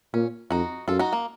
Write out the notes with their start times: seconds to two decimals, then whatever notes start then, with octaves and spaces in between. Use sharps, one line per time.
0.14 A#2 C#4
0.51 F2 D#4 F#4
0.88 F#2 F4 A4
0.99 D#4 F#4
1.13 A#3